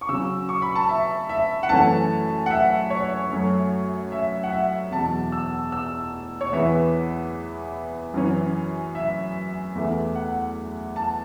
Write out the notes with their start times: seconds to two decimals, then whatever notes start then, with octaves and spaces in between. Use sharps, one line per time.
0.01 C#6
0.09 C#3 F#3 C#4 E6
0.49 C#6
0.62 B5
0.75 A5
0.89 E5
1.29 E5
1.63 F#5
1.69 F#2 E3 A3 C#4 A5
2.46 F#5
2.50 E5
2.90 C#5
3.31 F#2 F#3 A3
4.12 E5
4.43 F#5
4.52 E5
4.91 E2 B2 F#3 A5
5.32 E6
5.72 E6
6.41 C#5
6.53 E2 E3 B3 E5
8.14 F#2 E3 C#4
8.95 E5
9.75 E2 E3 A3 E5
10.15 F#5
10.96 A5